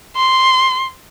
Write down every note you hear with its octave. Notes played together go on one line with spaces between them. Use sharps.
C6